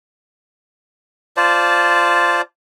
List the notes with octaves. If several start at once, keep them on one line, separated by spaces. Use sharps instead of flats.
F4 C5 D5 A5